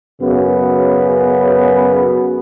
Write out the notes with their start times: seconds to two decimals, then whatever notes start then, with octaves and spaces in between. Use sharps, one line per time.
0.21 F#2 C#3 B3